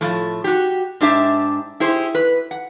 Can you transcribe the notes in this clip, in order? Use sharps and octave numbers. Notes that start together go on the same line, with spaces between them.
A2 F3 A3
F#4 G4
G#2 D4 G4 E5
E4 G4 G#4 C5
B4
F#5